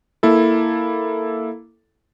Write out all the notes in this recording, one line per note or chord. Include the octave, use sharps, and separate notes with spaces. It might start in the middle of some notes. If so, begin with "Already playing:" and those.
A#3 E4 A4